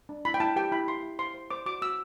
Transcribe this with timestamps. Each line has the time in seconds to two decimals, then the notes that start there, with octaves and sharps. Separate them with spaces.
0.09 D4
0.25 E4 B5
0.34 G5
0.40 E4 A5
0.56 G4 G5
0.72 E4 B5
0.87 E4 C6
1.03 E4
1.19 C5 C6
1.34 C5
1.51 C5 D6
1.66 F#4 D6
1.82 F#4 E6